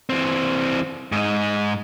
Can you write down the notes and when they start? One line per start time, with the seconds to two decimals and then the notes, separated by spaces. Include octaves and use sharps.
0.10 E3 C4
1.12 G#2 D#4